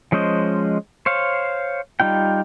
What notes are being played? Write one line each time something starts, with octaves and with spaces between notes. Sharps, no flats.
F3 G#3 C#4 C5 D#5
C5 C#5 F5
G3 D#4 F4 G5